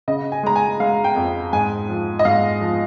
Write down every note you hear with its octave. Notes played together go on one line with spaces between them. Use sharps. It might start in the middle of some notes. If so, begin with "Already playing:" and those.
C#3 D#5
G#5
G#3 A#5
G#5
G#3 F5
G5
F2
G#2 G#5
F3
D#5
G#2 F5
F3